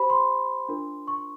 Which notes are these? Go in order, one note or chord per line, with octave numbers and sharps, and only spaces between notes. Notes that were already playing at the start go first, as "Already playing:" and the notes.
Already playing: G4 C5 B5
C6
D4 F4 A#4
C#6